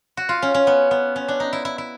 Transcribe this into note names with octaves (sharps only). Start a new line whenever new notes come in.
F#4
F4
C#4
C#4
B3
B3
C#4
D4
D#4
E4
E4
E4